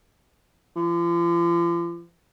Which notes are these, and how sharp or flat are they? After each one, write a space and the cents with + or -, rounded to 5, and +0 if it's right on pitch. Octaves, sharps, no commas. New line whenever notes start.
F3 -40